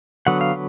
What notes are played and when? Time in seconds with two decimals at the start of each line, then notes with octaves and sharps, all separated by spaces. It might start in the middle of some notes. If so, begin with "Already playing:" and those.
0.27 D3 F#3 B3 F#5
0.41 F5